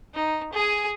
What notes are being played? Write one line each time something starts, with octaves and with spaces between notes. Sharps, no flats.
D#4
G#4 G#5